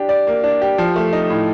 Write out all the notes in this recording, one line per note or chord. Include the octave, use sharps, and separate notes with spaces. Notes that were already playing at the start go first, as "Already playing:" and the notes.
Already playing: D4 G4
D5
A#3
D4
G4
F3
A3
D#4
A2